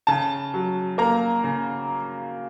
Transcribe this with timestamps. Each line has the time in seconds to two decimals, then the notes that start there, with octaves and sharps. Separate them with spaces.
0.07 C#3 A5
0.54 F#3
0.98 A#3 A#5
1.44 C#3